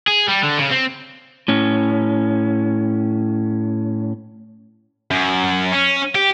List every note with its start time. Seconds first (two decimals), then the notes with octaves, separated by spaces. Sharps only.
0.08 G#4
0.28 G3
0.44 D3
0.59 C#3
0.72 C4
1.48 A2 C#4
5.11 F#2
5.72 C#4
6.15 G4